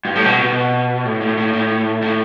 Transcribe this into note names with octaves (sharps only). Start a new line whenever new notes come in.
G2
A2
B2
B2
A2
A2
A2
A2
A2